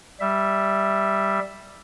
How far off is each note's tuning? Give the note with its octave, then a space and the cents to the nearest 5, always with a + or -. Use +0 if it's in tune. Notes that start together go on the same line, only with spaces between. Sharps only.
G3 +0 E5 +0